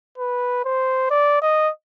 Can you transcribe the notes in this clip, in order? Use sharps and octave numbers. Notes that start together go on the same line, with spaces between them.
B4
C5
D5
D#5